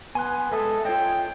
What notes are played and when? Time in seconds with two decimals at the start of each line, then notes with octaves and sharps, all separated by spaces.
0.15 B3 G#5 C6 F#6
0.52 G#3 A4 E5 D#6
0.85 F4 C#5 D#5 G5